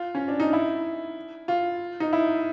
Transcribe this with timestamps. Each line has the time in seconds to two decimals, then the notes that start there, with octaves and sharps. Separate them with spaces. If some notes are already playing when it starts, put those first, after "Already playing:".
Already playing: F4
0.15 C#4
0.28 D4
0.40 D#4
0.53 E4
1.48 F4
2.00 D#4
2.13 E4